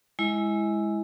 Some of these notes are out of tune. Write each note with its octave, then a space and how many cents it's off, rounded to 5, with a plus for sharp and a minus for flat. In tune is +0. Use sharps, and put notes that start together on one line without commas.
G#3 +0 E4 +0 D#5 +40